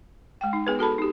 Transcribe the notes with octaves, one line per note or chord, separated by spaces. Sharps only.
G#3 G5
D#4
B3 G#4 B4
F#4 A4 A5 B5
D#4 G4